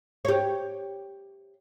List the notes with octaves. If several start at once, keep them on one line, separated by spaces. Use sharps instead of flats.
G4 C#5